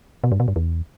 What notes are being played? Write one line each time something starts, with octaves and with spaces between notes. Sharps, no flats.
B2
G2
B2
G2
E2